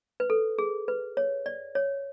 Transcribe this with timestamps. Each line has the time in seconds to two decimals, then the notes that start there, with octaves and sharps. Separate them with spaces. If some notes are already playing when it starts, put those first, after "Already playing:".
0.20 B4
0.30 A4
0.58 G#4
0.88 B4
1.17 C#5
1.46 D5
1.75 C#5